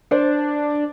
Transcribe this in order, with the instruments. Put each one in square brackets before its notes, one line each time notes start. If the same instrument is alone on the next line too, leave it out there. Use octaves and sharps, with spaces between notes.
[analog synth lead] D4 [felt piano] C5 D5